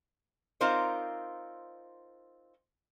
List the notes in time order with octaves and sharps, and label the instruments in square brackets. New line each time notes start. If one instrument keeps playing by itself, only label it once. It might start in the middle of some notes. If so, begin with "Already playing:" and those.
[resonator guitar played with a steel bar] C4 D#4 F4 A#4 C5 D5